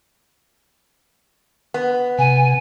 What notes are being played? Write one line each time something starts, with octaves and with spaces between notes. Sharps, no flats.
B3
C3 G#5